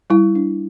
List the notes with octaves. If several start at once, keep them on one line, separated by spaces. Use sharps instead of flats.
G3 E4
D4